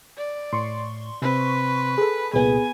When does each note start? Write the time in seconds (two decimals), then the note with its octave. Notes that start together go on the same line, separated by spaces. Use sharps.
0.17 D5
0.53 A2 C6 C#6
1.22 C3 C4 B4
1.98 G#4 A4
2.34 C2 A#2 B3 G#4 G#5